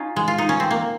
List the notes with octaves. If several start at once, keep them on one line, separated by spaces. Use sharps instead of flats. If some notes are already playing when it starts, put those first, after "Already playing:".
Already playing: C#4 D#4 F4
G#3
F4
D#4
C#4
C4
A#3